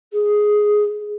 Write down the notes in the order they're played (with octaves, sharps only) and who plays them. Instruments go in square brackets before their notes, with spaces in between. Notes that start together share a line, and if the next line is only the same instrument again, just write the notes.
[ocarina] G#4